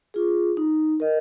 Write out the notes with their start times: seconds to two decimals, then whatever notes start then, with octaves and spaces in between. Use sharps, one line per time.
0.14 F4 G#4
0.57 D#4
1.00 A#4 D#5